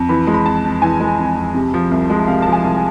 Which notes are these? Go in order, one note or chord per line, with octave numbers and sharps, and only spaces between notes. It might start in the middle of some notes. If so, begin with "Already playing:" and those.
Already playing: F2
E3 B5
G#3
B5
F2 A5
F2
E3 G#5
G#3
F2
F2
C3
F3
C2
G#3
C3 F5
F3 A5
G#5
C2